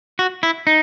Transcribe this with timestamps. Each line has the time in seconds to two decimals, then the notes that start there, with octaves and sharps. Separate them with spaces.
0.19 F#4
0.43 E4
0.67 D#4